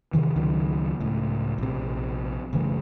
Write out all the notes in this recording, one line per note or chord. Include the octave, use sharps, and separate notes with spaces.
C3 D#3 E3
C#2 D#3 F#3
C#2 A2
A#1 C3
F#1 C#3 E3 A3